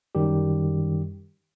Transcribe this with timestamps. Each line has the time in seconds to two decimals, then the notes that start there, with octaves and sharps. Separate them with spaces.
0.15 F#2 D#3 G3 G4